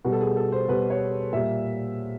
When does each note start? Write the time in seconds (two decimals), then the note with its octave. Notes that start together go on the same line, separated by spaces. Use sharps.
0.05 B2 G3
0.12 A4
0.21 G#4
0.37 A4
0.52 C5
0.68 B2 G3 B4
0.90 C#5
1.33 A#2 G3 E5